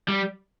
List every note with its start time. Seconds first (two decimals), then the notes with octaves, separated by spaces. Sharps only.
0.08 G3